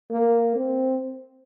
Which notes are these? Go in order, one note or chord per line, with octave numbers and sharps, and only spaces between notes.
A#3
C4